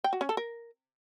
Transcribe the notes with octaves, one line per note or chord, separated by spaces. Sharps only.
G5
F#4
C#4
A4
A#4